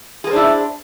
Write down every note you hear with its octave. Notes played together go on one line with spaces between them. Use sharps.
D4 E4 G#4 A#4 C5